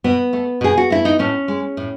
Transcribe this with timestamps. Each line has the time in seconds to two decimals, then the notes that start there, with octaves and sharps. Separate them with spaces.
0.04 B2 B3
0.33 A3
0.61 B2 G#4
0.77 F#4
0.90 A3 E4
1.05 D#4
1.19 A2 C#4
1.48 G#3
1.77 A2